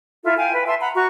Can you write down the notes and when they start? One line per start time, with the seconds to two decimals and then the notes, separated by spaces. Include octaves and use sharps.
0.24 E4 F4 A4 E5
0.37 F5 G5 G#5
0.53 B4
0.67 E5 A5 C6
0.81 F#5 A#5 B5
0.95 F#4 A#5 C#6